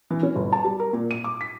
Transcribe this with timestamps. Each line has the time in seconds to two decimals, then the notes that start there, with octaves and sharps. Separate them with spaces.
0.11 E3
0.23 C#4
0.36 G1
0.53 A5
0.64 G3
0.80 A#4
0.93 A#2
1.11 D#7
1.24 D6
1.41 B6